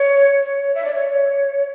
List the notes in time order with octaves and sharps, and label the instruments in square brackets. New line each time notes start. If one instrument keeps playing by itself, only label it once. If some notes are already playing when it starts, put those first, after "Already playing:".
Already playing: [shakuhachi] C#5
C#5
E5
D5
C#5